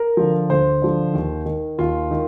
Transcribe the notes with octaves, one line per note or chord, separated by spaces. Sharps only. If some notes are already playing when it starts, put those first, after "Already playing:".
Already playing: A#4
D3 F3
D2 C5
D3 F3
D#2
D#3
D#2 F4
D#3